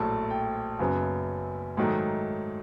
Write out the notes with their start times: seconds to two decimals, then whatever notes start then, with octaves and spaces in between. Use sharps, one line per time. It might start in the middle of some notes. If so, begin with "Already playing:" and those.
Already playing: A#1 A2 F#3 A3 A5
0.30 G5
0.79 F#1 F#2 C#3 F#3 B3
1.77 G#2 D#3 F#3 A3